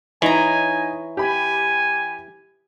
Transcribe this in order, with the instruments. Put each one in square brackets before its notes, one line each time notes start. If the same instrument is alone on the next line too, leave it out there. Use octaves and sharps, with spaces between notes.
[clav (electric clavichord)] E3 [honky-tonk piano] D#4 [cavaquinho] C#5 A#5 [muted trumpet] G#5
[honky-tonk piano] G4 B5 [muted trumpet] G#5